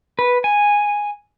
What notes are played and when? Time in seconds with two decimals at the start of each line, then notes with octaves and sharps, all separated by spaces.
0.19 B4
0.44 G#5